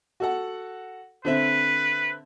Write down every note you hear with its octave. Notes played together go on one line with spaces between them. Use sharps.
F#4 A4 F#5
D3 C4 B4 E5